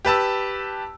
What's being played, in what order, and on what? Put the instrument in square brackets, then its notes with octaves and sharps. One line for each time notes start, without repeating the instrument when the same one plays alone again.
[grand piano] G4 B4 A5 E6